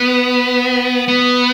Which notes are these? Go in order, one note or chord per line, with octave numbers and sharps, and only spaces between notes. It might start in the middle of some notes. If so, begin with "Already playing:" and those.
Already playing: B3
B3